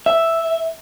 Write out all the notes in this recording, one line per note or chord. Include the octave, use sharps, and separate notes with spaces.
E5